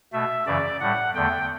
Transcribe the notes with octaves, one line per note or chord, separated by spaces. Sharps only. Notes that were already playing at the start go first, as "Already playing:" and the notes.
B2 A3 E5
F#2 C#3 E3 D5
A2 G3 F#5
E2 D3 A3 G5